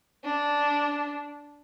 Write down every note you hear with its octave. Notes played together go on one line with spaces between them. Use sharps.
D4